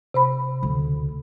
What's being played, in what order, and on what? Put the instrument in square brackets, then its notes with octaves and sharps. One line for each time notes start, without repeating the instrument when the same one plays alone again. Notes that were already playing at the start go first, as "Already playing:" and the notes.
[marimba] C3 C5 B5
[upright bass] D2 C#3